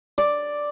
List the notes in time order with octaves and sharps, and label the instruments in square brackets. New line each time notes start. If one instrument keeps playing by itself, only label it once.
[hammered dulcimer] D5